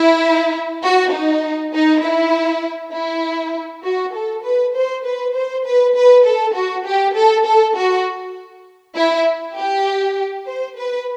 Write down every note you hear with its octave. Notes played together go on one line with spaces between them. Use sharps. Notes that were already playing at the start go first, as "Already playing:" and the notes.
Already playing: E4
F#4
D#4
D#4
E4
E4
F#4
A4
B4
C5
B4
C5
B4
B4
A4
F#4
G4
A4
A4
F#4
E4
G4
C5
B4